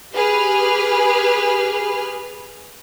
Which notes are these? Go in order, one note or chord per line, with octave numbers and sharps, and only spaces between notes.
G4 G#4 B4 F6